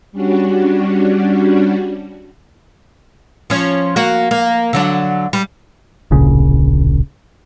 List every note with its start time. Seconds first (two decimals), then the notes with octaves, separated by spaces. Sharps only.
0.12 G3 C#4 D4 F#4
3.50 F3 C#4
3.96 A#3 F#4
4.31 A#3
4.73 D3 F#3 D4
5.33 G3
6.11 D1 A#1 C#3